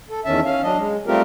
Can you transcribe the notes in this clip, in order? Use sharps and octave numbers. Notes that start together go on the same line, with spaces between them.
A4
E2 D#3 C#4 E5 A5
C#4 F5
F#3 D4 D#5
G#3
G3 A3 C4 F4 G4 A#4